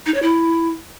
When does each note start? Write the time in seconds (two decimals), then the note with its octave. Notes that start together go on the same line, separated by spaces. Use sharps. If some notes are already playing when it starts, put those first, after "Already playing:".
0.06 D#4
0.14 C#5
0.22 E4